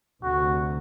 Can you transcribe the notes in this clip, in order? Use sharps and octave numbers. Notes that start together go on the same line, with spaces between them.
D2 C3 F#4